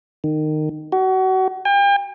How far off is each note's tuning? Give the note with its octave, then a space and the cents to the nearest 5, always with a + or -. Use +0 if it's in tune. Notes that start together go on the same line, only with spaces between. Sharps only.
D#3 -20
F#4 +30
G5 +40